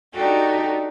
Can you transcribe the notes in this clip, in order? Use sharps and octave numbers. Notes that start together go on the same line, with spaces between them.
D4 D#4 F#4 G4 A4